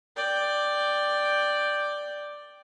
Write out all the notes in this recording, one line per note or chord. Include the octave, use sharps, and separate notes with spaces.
D5 G5